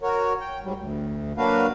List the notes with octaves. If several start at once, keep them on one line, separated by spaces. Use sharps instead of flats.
F#4 A#4 C#5
G5
G#2 F#3 G3
D2
F#3 A#3 D4 F#4 B4 F5